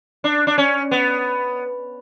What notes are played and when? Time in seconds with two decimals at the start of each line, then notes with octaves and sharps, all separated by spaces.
0.24 D4
0.47 D4
0.58 C#4
0.91 B3